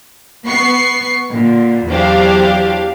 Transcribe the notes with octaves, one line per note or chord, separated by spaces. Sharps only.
B3 C#6 C7
A#2 D3
E2 F#3 D4 G4 C5 F5